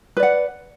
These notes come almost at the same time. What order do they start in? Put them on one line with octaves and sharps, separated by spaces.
B4 D5 F#5